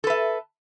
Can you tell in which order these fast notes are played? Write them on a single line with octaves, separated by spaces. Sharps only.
A4 B4 E5